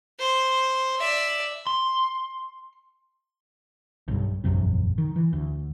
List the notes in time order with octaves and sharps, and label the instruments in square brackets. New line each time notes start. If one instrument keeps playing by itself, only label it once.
[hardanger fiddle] C5
D5 E5
[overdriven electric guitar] C6
[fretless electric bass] B1 G2
E1 A#1 F#2 C3
D#3
E3
D2